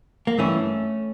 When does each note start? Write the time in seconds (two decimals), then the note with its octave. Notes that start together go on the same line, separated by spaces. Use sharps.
0.27 A#3
0.38 G2 E3 A3 C#4